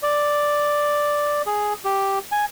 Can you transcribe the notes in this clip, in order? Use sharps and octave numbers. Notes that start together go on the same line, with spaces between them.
D5
G#4
G4
G#5